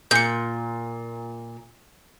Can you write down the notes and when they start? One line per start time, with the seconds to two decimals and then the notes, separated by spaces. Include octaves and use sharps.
0.11 A#2 G6 C#7